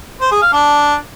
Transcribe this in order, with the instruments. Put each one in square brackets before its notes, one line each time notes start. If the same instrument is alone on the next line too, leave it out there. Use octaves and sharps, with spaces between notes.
[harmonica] C5
G#4
F5
D4